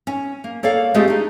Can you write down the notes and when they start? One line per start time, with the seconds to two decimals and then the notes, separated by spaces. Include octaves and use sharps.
0.07 C#4
0.44 A#3
0.63 A#3 A4 C#5 D5 F5
0.94 G#3 A3 C4 F4 G4 G#4
1.08 D4 D#4